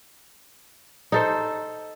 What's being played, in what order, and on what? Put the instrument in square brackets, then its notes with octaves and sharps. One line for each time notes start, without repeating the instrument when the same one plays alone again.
[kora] D#4 A4 C5